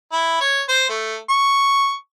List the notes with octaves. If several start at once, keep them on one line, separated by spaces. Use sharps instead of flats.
E4
C#5
C5
A3
C#6